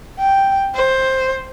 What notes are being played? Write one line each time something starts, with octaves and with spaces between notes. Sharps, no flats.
G5
C5